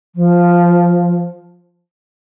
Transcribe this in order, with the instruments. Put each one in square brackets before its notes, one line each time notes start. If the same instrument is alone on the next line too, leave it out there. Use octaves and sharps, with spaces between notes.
[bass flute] F3